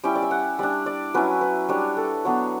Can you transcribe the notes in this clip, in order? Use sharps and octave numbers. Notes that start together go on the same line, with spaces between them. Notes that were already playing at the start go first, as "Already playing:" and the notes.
G3 C#4 E4 G5
D5
E5
F#5
G3 D4 D5
D5
F#3 C#4 E4 B4
B4
G3 D4 C#5
A4
F#3 B3 D4 C#5